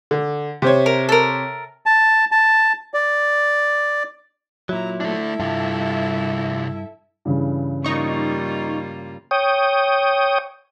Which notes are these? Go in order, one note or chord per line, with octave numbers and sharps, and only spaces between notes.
D3
C3 C5 C#5
A#4
A4 A#4
A5
A5
D5
A#2 F#3 E4 A#5
A3 D4 E4 A4 E5
C2 G2 F4
G2 C#3 E3
G3 A#3 D#4 F4 C#6
C#5 G5 D#6